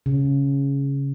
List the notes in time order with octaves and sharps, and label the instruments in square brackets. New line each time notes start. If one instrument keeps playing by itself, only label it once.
[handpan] C#3